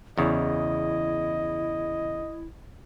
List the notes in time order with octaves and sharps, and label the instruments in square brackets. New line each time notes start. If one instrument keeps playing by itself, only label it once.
[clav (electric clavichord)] E2 C#3 [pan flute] E4 [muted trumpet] D#5